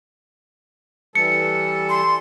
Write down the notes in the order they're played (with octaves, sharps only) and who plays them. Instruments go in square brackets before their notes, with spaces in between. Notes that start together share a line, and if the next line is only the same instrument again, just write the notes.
[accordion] E3 G3 A4 [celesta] C#7
[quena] C6